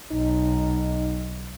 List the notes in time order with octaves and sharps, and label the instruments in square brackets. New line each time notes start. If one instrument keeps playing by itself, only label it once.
[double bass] B1 [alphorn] D#4